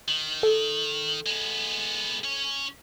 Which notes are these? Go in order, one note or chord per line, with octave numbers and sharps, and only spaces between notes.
D#3
A4
G#3 B3
C#4 C#5